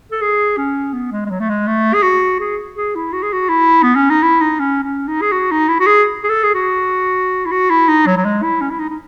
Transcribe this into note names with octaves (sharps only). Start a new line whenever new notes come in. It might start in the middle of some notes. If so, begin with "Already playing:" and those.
A4
G#4
C#4
B3
G#3
G#3
F#3
A3
G#3
A3
G#4
F#4
G#4
G#4
E4
F#4
G#4
F#4
E4
B3
C#4
D#4
E4
D#4
C#4
C#4
D#4
G#4
F#4
D#4
E4
F#4
G#4
G#4
A4
G#4
F#4
E4
F#4
E4
D#4
F#3
F#3
G#3
E4
C#4
E4
D#4
D#4